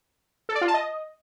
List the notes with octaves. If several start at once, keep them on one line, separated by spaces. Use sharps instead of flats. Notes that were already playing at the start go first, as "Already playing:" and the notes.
A4
D5
F4
A5
D#5